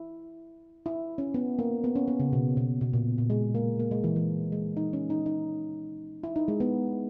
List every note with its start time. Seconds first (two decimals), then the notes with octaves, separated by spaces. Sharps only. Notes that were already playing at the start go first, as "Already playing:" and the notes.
Already playing: E4
0.86 E4
1.18 C#4
1.34 B3
1.59 A#3
1.84 B3
1.96 C#4
2.08 B3
2.20 C#3
2.33 B2
2.57 B2
2.81 B2
2.93 A#2
3.18 A#2
3.30 G#3
3.55 A#3
3.79 A#3
3.91 G#3
4.04 E3
4.16 E3
4.52 G#3
4.77 D#4
4.93 C#4
5.10 D#4
5.26 D#4
6.23 E4
6.36 D#4
6.48 G#3
6.60 B3